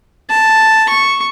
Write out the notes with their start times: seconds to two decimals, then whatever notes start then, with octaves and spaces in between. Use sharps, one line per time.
0.30 A5
0.89 C#6